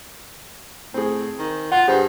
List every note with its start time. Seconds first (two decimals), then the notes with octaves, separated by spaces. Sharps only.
0.94 A2 C4 G#4
1.39 D#3
1.72 F4 F#5
1.88 G2 G#4 C5